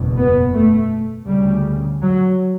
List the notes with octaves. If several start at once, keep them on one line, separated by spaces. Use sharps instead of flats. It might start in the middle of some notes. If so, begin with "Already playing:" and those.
Already playing: F#1 E2 B2
B3
A3
D2 C#3 G3
F#3